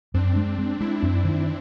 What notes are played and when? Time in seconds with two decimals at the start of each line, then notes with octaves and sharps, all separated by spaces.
0.14 F#2 C4 D4
0.36 G#3
0.59 G#3
0.80 G#3 D4 E4
1.02 F#2
1.25 D#3